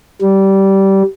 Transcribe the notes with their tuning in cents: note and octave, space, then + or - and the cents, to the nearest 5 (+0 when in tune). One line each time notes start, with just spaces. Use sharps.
G3 -15